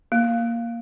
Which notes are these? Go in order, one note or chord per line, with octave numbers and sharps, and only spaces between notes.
A#3